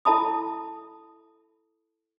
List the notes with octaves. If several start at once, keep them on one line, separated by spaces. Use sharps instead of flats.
E4 A4 E5 A5 B5 D#6